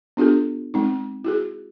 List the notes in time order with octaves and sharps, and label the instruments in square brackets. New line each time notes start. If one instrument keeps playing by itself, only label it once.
[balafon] B3 D4 F4 G4 A4
G#3 C4 D#4
E4 F#4 G#4